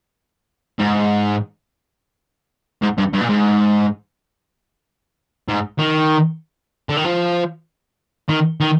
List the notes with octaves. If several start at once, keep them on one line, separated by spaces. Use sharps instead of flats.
G#2
G#2
G2
G2
A#2
G#2
G#2
D#3
D3
D#3
F3
D#3
D#3